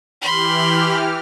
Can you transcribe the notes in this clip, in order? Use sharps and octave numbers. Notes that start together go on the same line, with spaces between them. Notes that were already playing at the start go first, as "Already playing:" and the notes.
E3 G4 B5 C6 F6